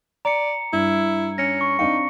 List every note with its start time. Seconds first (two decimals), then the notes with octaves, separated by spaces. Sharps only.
0.25 D5 A#5 C#7
0.73 G2 E4
1.38 C#4 A#6 C#7
1.61 C#6
1.79 C4 D4 D#4 F5 C#7